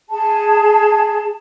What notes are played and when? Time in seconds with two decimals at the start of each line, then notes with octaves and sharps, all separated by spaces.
0.08 G#4 A5